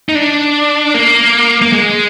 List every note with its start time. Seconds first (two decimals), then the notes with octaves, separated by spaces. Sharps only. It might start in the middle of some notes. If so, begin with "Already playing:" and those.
0.09 D#4
0.15 D4
0.94 A#3
1.62 A#3
1.73 G#3